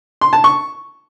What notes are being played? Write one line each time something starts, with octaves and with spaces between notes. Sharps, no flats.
C6
A5
C#6